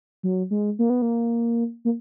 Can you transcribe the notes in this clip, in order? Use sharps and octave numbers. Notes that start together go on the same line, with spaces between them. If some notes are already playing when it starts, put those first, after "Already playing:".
F#3
G#3
A#3
B3
A#3
A#3